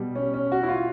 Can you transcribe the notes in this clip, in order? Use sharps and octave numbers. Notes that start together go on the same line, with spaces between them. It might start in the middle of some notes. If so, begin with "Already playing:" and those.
Already playing: B2 G3
C#4
C#4
F#4
E4
F4